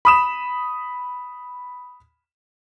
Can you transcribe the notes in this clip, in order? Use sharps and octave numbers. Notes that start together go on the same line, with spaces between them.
B5 D#6 E7